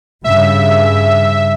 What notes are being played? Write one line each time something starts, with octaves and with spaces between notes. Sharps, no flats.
G2 C#3 E5